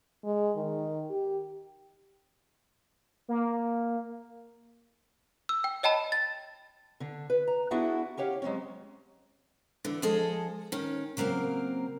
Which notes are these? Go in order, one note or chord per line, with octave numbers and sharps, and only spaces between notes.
G#3
D#3
G4
A#3
E6
G5
C#5 D#5 G5 A5 B5
A6
D3 D4
B4
A#5
B3 D4 E4 F#4 G#4 F#5
C#4 G4 C#5 F5 F#5
F#3 G#3 A3 C4 C#4
D3 E3
F3 G#3 G#4 A4 D#5
D#3 C#4
C#3 F#3 A#3 C4 A#4